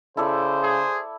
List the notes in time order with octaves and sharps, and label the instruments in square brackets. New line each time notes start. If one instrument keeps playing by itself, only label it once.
[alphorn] C#3 [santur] E4 A4 D5 [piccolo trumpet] C5
[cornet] G#4